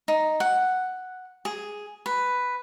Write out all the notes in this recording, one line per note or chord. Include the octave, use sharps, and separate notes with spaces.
D#4
F#5
G#4
B4